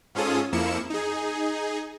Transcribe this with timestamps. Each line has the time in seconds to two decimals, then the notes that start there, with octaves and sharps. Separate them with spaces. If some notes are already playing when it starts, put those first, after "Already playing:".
0.15 G#2 C#4 F4 G#4 A4 D#6
0.52 F2 F3 A#3 E4 C#7 E7
0.90 D#4 G#4